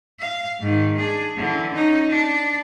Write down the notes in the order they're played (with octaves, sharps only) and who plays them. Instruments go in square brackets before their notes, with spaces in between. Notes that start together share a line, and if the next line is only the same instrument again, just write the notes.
[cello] F5
G#2 D#3
D4 G#4
D3 E3
C#4 D#4
D4